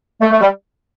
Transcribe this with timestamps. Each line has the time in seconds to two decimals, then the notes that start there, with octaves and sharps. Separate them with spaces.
0.21 A3
0.31 A3
0.41 G3